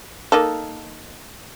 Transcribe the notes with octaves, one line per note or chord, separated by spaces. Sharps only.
A#3 D#4 A4